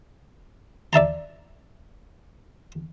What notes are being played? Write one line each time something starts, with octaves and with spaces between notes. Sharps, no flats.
D5 E5 A5 A#5